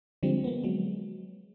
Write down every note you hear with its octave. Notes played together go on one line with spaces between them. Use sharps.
D3 F3 G3 G#3 C4
A#3 B3
F#3 G#3